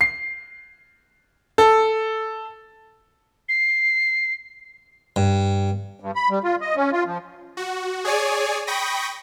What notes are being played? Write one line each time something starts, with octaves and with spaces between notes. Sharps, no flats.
C7
A4
C7
G2
G2
B5
G3
F4
D#5
C#4
F4
F3
F#4
G#4 C#5 D5 G#5
G5 B5 C#6 D#6 A#6